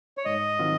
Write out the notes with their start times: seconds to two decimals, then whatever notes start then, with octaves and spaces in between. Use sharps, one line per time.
0.17 C#5
0.25 G#2 D#5
0.59 D#3 F#3 C4 F4